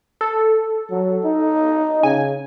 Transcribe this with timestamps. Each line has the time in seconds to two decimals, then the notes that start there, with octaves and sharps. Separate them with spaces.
0.21 A4
0.91 F#3
1.25 D#4
2.03 C#3 G#5